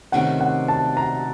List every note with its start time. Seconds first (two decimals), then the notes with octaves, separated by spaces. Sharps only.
0.12 C3 D#3 A3 C#4 F#5
0.41 F#5
0.68 A5
0.97 A#5